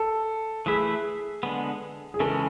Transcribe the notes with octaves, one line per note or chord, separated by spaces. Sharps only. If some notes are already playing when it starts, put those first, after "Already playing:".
Already playing: A4
E3 A3 E4 G#4 B4 E5
D3 G#3 B3
G#4
C#3 E3 G#3 C#4 A4